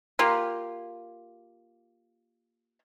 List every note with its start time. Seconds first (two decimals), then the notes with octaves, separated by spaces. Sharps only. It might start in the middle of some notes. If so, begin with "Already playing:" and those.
0.19 A#3 F4 G4